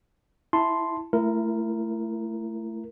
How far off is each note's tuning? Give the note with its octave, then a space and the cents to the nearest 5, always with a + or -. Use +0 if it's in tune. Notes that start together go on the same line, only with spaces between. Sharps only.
E4 +0 A5 +0 C6 +0
A3 +10 E4 +30 A#4 +0